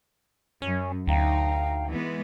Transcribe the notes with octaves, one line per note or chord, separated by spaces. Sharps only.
F#2 C#4
D2 D#4 F5 G5 A#5
E3 G#3 B3